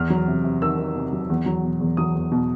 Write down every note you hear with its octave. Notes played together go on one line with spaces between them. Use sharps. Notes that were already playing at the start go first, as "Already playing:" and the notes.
Already playing: E2 F6
F#3
C3
C3
D#3 E6
D#3
C3
F#3
E2
F#3
B2
E2
F#3 D#6
E2
B2